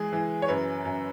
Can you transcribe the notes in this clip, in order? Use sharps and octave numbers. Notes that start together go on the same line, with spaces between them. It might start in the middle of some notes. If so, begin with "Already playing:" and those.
Already playing: E3 G#3 G#4
E3
C#5
F#2 B4
F#2